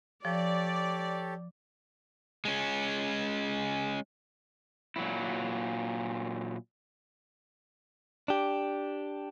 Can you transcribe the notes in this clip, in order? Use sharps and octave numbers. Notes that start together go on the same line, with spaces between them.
F3 G4 A4 C#5 D5
G#3 C#4
A#2 F#3 E4
D4 G4